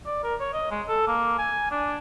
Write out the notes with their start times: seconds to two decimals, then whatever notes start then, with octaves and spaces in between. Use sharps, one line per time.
0.06 D5
0.24 A#4
0.40 C#5
0.53 D#5
0.71 G#3
0.89 A4
1.07 A#3
1.38 G#5
1.71 D4